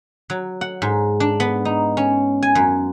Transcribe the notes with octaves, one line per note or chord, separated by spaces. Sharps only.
F#3
F#5
G#2
D4
B3
D#4
C#4
G#5
F#2